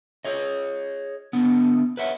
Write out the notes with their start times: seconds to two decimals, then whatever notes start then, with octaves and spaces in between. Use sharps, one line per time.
0.25 G#4 C#5 D#5
1.33 D3 B3
1.97 B4 C#5 E5 F#5